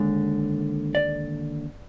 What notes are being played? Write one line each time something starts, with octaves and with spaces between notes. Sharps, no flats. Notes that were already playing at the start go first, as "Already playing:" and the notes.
Already playing: D#2 D3 G#3
D5